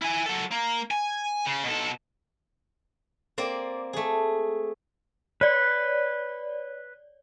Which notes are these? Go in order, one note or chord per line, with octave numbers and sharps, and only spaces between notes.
E4 G#5
F#3 A4
A#3
G#5
C#3
B2 A4
A#3 C4 D5
A3 G#4
B4 C#5 D5